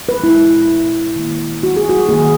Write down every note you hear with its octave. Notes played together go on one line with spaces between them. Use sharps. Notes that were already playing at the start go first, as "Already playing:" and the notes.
B4
A#2 G#3 E4
D#3 A#3
F#4
G#4
F#4
D#3 A#3 G#4